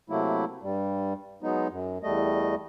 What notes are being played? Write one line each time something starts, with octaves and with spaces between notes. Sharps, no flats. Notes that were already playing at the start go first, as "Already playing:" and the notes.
C3 F#3 A3 A#3 E4
G2 G3
F#3 G#3 B3 D#4
F#2
E2 G3 A3 D#5